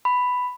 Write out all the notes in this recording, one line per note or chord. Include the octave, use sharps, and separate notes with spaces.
B5